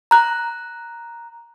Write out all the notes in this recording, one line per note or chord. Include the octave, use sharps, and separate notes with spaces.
A#5 F#6